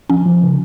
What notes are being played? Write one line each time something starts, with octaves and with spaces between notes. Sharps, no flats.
F3 C#4
F3
C#3